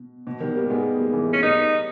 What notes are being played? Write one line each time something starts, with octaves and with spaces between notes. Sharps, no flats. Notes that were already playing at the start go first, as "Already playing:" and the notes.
Already playing: B2
B2
D#3 G3
G3 A#3
G#3 B3
G3 A#3
E3 G#3
G3 A#3
C#4
G3 A#3 D#4